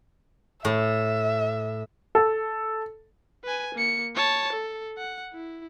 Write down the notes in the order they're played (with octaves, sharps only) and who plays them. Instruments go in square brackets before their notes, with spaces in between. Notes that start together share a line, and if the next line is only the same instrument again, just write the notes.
[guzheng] A2 [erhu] E5
[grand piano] A4
[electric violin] B4 G#5
A#3 C#7
C#5 A5
A4
F#5
E4